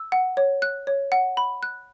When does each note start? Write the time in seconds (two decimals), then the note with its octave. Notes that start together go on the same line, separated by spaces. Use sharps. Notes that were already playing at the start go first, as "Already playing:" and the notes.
Already playing: E6
0.12 F#5
0.37 C#5
0.62 F#6
0.87 C#5
1.12 F#5
1.37 B5
1.63 F#6